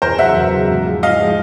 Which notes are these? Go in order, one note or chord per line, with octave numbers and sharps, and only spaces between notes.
E2 A#4 C5
C#3 F#3 E5 F#5
E2
C#3 F#3
G#2
F3 G#3
G#2 D#5 F5
F3 G#3